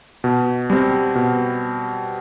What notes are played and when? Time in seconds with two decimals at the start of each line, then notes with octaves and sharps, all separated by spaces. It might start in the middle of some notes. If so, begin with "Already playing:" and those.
0.24 B2
0.70 G3 C4
1.15 B2